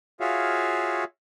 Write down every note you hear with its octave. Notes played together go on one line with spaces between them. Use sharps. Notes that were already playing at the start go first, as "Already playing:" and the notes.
F4 F#4 G#4 C#5 E5 F5